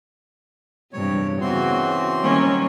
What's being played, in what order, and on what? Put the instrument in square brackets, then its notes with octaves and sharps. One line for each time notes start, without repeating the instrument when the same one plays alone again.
[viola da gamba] E2 G2 C3 [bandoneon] C#5
[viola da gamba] C#3 B3 F#4 [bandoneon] E3 C4 C6
[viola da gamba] D#3 F#3 G3 [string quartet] A#3 C#4